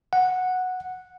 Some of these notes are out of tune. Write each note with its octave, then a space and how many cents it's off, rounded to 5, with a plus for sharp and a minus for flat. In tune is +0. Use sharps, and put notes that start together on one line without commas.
F#5 -5